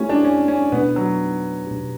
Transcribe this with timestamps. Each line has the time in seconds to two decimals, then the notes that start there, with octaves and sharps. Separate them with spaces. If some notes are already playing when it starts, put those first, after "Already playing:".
Already playing: A3 C#4 E4 G4
0.09 D4
0.25 C#4
0.48 C#4
0.72 B2 A3 B3 D4
0.96 F#3
1.67 B2 A3 D4 G4